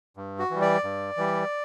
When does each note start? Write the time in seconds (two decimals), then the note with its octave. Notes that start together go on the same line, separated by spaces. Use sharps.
0.17 G2
0.39 F#4
0.50 E3 G3
0.62 D5
0.84 G2
1.17 E3 G3